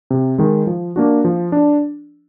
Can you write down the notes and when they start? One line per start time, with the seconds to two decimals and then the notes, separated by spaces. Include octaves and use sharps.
0.10 C3
0.38 D#3 G#3
0.67 F3
0.96 A#3 D4 F#4
1.25 F3
1.52 D4